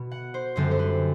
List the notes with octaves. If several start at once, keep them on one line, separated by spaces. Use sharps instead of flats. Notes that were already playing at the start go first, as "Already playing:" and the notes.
Already playing: B2 B3
F#5
C5
F#2 D3 G3 C4 C5
C5
B4